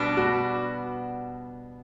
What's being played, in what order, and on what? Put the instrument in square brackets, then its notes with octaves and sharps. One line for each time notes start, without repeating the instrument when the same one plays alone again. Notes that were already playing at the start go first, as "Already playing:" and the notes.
Already playing: [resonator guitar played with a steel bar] B2 G3 B3 D4
[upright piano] F#4